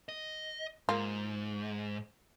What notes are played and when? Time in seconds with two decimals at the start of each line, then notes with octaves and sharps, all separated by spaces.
0.09 D#5
0.89 G#2 A#3 F4